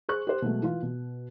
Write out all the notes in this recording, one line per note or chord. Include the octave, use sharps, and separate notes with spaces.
G#4 C5 C#6 F#6
G4 C5
B2 F#3 G#3 A3
E3 F4
B2